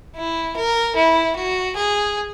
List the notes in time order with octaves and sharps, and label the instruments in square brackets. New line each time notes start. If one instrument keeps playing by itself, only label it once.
[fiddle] E4
A#4
E4
F#4
G#4